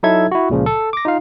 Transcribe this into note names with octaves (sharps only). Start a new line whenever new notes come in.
F#3 D#4 E4 A4 E5 G#6
E4 F#4
C#2 A#2 C#3 F3
A4
D6 A#6
D#4 F4 F5